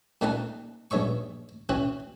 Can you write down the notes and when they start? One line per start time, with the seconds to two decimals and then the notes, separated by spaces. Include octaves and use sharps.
0.21 A#2 A3 C4 D#4 F#5 A5
0.91 A#1 G2 C#5 E5 C#6
1.69 E3 C4 C#4 F#4